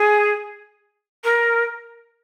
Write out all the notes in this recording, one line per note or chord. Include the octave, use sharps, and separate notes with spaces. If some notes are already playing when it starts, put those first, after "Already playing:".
Already playing: G#4
A#4